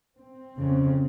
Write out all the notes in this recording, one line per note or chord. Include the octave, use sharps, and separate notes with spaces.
C4
F2 C#3